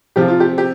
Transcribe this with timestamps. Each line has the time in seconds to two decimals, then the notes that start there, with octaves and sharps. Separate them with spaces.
0.16 C3 F3 C4 F4 G4
0.28 F4
0.40 G4
0.58 G4